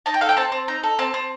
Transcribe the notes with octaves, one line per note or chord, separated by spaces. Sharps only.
D#4 A5
G5
A4 F5
G5
C4 A5
C4
D#4 A#5
A4
C4 A5
C4